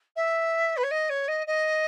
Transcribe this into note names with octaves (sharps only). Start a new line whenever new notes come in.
E5
B4
C#5
D#5
C#5
D#5
D#5